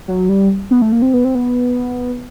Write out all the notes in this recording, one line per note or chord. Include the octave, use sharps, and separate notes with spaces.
F#3
G3
B3
A3
A#3
C4
B3
C4
B3